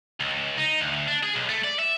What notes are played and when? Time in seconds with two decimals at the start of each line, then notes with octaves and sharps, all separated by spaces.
0.20 C#2
0.58 D#4
0.81 D2
1.08 D4
1.23 G#4
1.35 B1
1.49 A3
1.64 D5
1.79 E5